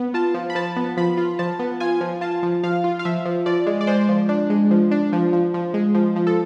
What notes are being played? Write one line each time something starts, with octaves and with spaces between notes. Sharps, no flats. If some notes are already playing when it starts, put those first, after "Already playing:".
Already playing: B3
F4 A5
F3
B5
F3 A5
B3
F3 B5
F4
F3 A5
B3
F4 G#5
F3
F4 A5
F3
F3 F5
F4
F5
F3 E5
F3
F3 D5
G#3
D5
G#3 C5
F3
D4
G#3
F3
D4
F3
F3
F3
G#3
F3
F3
A4